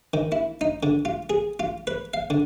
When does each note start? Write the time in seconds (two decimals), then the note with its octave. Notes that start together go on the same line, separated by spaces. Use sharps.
0.14 D#3
0.32 E4
0.61 D#4
0.83 D3
1.05 F4
1.30 G#4
1.60 F4
1.87 B4
2.14 F5
2.30 D3